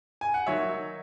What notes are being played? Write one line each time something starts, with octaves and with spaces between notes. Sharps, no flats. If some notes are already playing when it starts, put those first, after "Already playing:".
G#5
F#5
D#3 F#3 C#5 E5